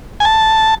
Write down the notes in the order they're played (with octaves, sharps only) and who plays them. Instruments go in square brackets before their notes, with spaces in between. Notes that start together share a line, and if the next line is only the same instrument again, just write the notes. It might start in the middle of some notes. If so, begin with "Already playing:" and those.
[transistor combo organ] G#5
A5